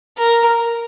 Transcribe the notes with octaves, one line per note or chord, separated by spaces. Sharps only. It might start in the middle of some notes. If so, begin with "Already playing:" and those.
A#4